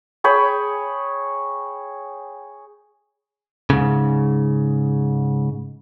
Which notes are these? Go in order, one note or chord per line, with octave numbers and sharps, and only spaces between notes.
G#4 C#5 G5 B5
G#2 C#3